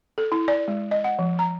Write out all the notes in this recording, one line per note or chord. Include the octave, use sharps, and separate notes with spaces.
A4
E4
D5
G#3
D#5
F#5
F3
A#5